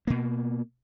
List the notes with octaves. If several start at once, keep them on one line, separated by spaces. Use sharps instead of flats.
B2 A#3